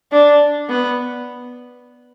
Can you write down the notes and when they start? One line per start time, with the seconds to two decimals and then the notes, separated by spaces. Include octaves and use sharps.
0.12 D4
0.69 B3